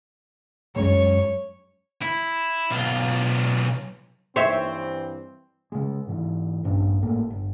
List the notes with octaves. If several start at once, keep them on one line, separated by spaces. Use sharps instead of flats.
F#2 G#3 C#5
E4
B1 F4
G2 E3 C4 C5 C#5 E5 C7
C#3 G#3
G#2 E3
A#1 G2 C#4
G#1 A2 A3 A#3
G1